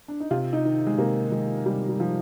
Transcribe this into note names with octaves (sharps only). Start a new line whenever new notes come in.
D4
D#4
C3 F4
D#4
D#3
G#3
C3 A#3
D#3 G#3
C3 G3
G3
D#3 F3